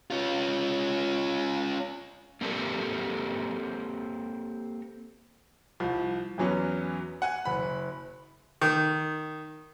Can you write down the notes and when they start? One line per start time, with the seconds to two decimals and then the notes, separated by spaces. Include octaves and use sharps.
0.10 C#4 F4
2.41 A#3 C4 G4 A4 A#4
5.80 C2 F3
6.38 E2 E3 F#3 B3 C#4
7.22 F#5 G#5 F#6
7.45 F#1 B5
8.62 D#3